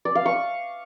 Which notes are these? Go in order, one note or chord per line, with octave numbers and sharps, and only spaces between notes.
D5
F5
C#6